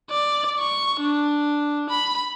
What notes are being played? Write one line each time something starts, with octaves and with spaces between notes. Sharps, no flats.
D5
C#6
D4
B5